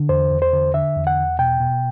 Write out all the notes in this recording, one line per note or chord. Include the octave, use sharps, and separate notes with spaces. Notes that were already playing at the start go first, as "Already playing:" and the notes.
Already playing: D3
E2 C5
E2
C5
D3
D3 E5
E2
F#5
E2
B2 G5
B2